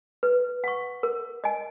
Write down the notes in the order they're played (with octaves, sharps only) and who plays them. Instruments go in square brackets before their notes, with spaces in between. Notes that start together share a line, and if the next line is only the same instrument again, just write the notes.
[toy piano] B4
F#5 C#6
A#4
D#5 G#5